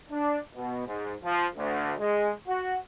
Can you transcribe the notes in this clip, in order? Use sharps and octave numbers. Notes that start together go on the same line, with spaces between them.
D4
B2
G#2
F3
D2
G#3
F#4